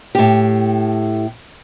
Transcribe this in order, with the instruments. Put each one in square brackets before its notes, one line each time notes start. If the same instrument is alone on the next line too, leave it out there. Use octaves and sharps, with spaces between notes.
[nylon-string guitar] A2 G4